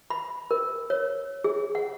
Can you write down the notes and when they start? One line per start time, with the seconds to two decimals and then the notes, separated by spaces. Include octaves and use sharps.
0.10 B5
0.51 A#4
0.90 C#5
1.44 G#4
1.75 F#5